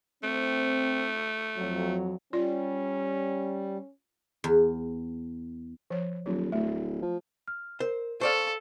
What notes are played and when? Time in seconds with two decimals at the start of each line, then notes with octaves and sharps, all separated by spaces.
0.23 A3 C4
1.57 F2 F#3
2.33 G3 C#4 F4 D5
4.44 E2
5.90 F3 C#5
6.26 D#1 F#3
6.52 D1 A3
7.02 F3
7.48 F6
7.80 A#4 C5
8.21 A4 C5 D5 F5 C#6